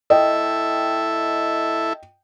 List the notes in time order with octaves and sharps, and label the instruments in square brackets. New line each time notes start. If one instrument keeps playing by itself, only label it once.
[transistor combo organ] E4 A4 E5 [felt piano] D#5 G5